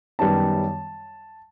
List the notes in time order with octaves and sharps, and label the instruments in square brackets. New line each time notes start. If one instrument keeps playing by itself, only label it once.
[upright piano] F#2 D#3 G3 B3 [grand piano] A5